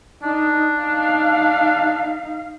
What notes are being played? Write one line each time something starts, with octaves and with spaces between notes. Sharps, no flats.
D4 D#4
D#4 F5